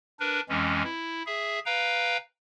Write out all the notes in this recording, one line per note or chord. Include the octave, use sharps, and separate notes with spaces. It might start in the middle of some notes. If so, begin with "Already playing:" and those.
D4 A#4 B4
F2 E3 G#3 C#4
E4
G#4 E5
B4 F5 G5 A#5